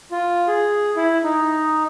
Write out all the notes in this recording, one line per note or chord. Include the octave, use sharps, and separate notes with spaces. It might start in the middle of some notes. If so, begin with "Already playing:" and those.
F4
G#4
E4
D#4